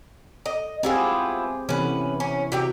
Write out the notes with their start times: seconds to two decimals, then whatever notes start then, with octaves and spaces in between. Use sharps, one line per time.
0.46 D#5
0.83 B3 C4 E4 F4 G4 G#4
1.69 C3 E3 B3 C#4 B4
2.20 C#4
2.52 C3 F#4 G4 G5